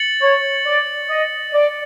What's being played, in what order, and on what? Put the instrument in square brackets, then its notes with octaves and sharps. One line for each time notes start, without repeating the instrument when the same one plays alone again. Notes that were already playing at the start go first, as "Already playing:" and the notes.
Already playing: [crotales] A6 C#7 F#7
[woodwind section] C#5
D5
D#5
D5